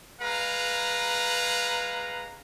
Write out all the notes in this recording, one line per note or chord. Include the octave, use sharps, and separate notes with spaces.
G#3 B4 F5 A#5